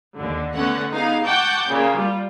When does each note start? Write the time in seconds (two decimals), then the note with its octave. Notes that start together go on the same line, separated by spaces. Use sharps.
0.15 D#2 D3
0.53 D3 A3 B3 C#4 A4 F#5
0.89 B3 D#4 G4 G#4 F5
1.24 F#5 G5 A5 C#6 D6 G6
1.67 A#2 C#3 A#3
1.97 G3 F4